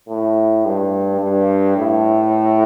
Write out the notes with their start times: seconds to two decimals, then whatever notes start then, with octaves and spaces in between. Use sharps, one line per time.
0.09 A2
0.66 G2
1.21 G2
1.78 A2